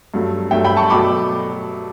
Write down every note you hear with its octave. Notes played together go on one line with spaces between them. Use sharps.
G2 F#3 A3
G2 F#3 A3 E5 G5
G5 B5
A5 C#6
B2 F#3 A3 B5 D6